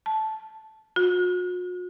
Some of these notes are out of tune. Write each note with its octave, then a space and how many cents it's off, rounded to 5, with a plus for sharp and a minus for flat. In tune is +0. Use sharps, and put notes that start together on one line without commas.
A5 -10
F#4 -45